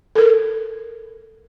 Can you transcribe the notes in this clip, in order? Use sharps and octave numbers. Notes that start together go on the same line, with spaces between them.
A4 A#4